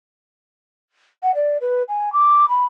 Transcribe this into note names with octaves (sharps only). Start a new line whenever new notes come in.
F#5
D5
B4
G#5
D6
B5